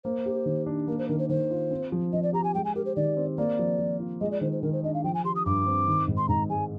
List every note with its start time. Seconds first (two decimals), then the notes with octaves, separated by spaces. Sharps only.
0.04 A#3 C5
0.26 G4
0.46 D#3
0.66 D4
0.88 A#3 A#4
0.98 C5
1.09 D#3 A#4
1.19 C5
1.29 D#3 C5
1.51 F4
1.71 C4
1.92 F3
2.13 F3 D#5
2.23 D5
2.33 G4 A#5
2.44 G#5
2.54 G#3 G5
2.65 G#5
2.75 G4 A#4
2.85 C5
2.96 D#3 D5
3.17 C4
3.38 A#3 D5
3.59 F3
3.79 F3
4.00 F4
4.21 G#3 D#5
4.31 D5
4.41 D#3 C5
4.52 C5
4.63 D#3 A#4
4.73 C5
4.83 D4 D#5
4.94 F5
5.04 F3 G5
5.14 G#5
5.24 G4 C6
5.36 D#6
5.46 G2 D6
5.66 C4
5.88 D#3
6.08 G#2
6.17 C6
6.28 G#2 A#5
6.50 G#3 G#5